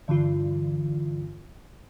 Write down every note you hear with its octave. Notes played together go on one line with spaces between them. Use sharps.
G2 D3 E3 F4